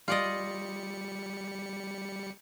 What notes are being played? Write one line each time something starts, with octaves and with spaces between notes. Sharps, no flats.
G3 F4 D5 D#5 C#7